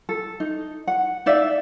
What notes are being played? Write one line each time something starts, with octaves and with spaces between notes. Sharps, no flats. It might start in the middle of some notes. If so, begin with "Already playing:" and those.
A4
D#4
F#5
D#4 D5 E5 F5